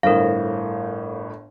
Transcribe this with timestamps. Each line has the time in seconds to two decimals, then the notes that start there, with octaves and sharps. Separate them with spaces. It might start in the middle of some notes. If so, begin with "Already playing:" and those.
0.03 G1 A2 A#4 C5 F5